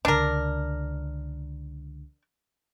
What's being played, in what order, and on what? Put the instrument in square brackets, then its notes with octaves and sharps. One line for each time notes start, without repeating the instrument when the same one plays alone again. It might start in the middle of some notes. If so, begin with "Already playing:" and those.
[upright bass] C#2 D3 [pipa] D4 A#4